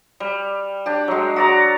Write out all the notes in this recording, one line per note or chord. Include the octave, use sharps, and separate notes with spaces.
G3
D4 G4
F#3 G#3
F#4 D5 A#5